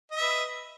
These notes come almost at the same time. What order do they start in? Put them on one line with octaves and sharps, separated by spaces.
D#5 E5 B4